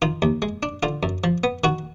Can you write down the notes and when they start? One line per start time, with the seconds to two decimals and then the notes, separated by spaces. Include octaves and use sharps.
0.02 D#3 F4
0.22 D#2
0.42 G#3
0.63 D4
0.83 D3 F4
1.03 F#2
1.24 F3
1.44 B3
1.64 D#3 F#4